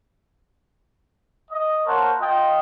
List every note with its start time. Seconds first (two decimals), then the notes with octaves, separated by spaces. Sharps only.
1.50 D#5
1.85 A#3 A#4 C5 C#5 F#5 A5
2.20 F4 D#5 G5